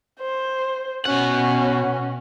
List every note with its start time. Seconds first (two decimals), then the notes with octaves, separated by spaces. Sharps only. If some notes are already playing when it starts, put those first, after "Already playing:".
0.20 C5
1.06 B2 C#4 F#4 F#5